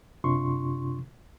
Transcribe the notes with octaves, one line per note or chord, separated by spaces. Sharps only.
F#2 C3 D4 F4 C6 C#6